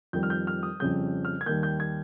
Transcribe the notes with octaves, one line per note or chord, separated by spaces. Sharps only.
F2 D#3 G3 G6
F6
G6
F6
D#6
F2 C#3 G3 G6
F6
G#6
D#2 D#3 G3 G6
G6
G#6